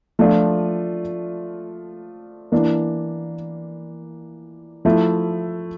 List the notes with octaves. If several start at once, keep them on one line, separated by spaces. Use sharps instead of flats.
F3 A3 D4 F4
E3 A#3 D4
F3 A3 E4